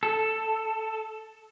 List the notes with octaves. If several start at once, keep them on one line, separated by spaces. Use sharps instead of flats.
A4